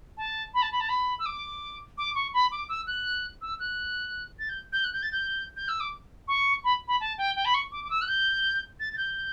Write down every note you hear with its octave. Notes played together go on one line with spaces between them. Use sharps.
A5
B5
A5
B5
A5
B5
E6
D6
D6
C#6
B5
D6
E6
F#6
E6
F#6
A6
G6
G6
F#6
G6
A6
G6
G6
E6
D6
C#6
B5
B5
A5
G5
G5
B5
C#6
D6
D6
E6
F#6
G6
A6
A6
G6